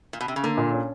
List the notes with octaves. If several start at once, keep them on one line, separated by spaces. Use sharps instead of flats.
A#2
B2
C3
C#3
D3 A#3
A#2
C#4